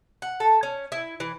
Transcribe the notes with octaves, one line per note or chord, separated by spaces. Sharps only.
F#5
A4
C#4
E4
E3